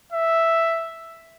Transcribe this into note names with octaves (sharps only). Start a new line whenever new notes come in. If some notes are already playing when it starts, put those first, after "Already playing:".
E5